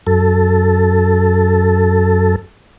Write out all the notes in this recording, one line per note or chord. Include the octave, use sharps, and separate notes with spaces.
F#2 A4